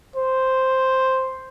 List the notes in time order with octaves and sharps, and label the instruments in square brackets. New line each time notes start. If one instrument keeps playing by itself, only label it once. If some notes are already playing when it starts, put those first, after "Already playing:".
[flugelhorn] C5